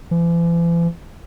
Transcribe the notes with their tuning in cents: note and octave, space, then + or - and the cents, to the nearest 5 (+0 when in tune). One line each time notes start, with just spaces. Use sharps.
E3 +45